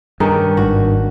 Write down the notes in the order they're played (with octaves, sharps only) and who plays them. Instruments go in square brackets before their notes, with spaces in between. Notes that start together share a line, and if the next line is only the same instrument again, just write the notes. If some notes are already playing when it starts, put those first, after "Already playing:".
[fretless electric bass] G2 [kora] D#3 C#4 D4 [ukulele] A#4
[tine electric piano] G#1 G#2 [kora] F#4